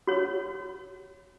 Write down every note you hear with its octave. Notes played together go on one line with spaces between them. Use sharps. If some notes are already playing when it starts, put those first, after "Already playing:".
F#4 C#5